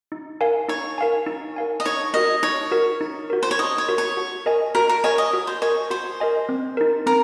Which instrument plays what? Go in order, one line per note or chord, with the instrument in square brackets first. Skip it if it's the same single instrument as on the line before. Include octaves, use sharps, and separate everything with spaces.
[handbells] D#4
A#4 F5 G#5
[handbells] D#4 [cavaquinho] C#5
[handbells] A#4 F5 G#5
D#4
A#4 F5 G#5
[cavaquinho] D#5
[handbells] D#4 [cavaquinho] C#5
[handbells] F#4 A#4 [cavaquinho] D#5
[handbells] D#4 [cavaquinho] C#5
[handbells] F#4 A#4
D#4
F#4 A#4
[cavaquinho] C5
C#5
[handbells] D#4 [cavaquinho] D#5
[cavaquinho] C#5
[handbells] F#4 A#4
[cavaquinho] C#5
[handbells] F#4
A#4 D#5 G#5
[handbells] F#4 [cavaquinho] A#4
[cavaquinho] A#4
[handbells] A#4 D#5 G#5 [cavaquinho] C#5
[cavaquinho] D#5
[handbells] F#4
[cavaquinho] C5
[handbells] A#4 D#5 G#5 [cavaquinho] C#5
[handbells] F#4 [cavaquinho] C5
[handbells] A#4 D#5 G#5
C4
D#4 A#4
[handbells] C4 [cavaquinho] A#4